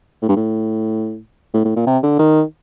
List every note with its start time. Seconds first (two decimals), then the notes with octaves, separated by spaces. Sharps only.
0.22 A2
0.29 G2
0.36 A2
1.54 A2
1.65 A2
1.76 A#2
1.86 C3
2.03 D3
2.19 D#3